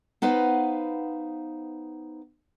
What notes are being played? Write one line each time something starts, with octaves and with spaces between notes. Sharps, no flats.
B3 D#4 B4 C5 F5